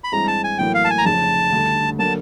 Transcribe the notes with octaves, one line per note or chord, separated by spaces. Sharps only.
B5
G2 E3 G#3 C4 A#5
A5
G#5
A1 A2 F#3 A#3 G5
F5
A5
G#5
A#5
F1 F2 C#3 F3 A5
D2 D3 G3
D3 F#3 A#3 A5